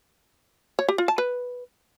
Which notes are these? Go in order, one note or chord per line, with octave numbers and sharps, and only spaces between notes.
C#5
G4
F4
A5
B4